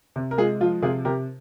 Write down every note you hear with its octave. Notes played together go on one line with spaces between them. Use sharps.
C3
A#4
G#3 F4 G#4
F3 F4
C3 F4 G#4
C3 G4 A#4